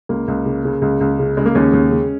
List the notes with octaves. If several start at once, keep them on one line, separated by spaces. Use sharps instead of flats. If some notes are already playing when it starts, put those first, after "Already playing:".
C#2 A#3
C#2
C#3
C#3
C#2
C#2
C#3
C#3 G#3
A#3
D#2 G#3 C#4
D#2
C#3